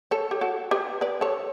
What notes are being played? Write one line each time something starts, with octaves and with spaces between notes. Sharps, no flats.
A4 C#5
G4
F#4 A4
G4 B4
B4 D5
A4 C#5